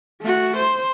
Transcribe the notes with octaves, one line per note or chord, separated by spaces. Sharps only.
A3 F#4
C5